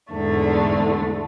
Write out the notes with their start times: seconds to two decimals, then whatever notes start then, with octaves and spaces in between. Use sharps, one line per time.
0.13 E2 G#2 D3 A3